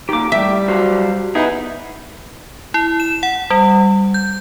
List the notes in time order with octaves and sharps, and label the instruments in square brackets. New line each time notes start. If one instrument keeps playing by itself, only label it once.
[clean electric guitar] A#2 D#3 [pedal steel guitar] G4 D6
[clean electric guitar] A2 [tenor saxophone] G3 [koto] E5
[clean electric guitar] F#3 C5
[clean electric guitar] B3 E4 [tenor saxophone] D#4 [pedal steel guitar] G#4
[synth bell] E4
E7
F#5
G3
G6